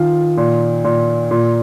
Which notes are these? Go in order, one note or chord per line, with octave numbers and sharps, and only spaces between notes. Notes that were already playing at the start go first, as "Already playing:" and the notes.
Already playing: D#3 F4
A#2
A#2
A#2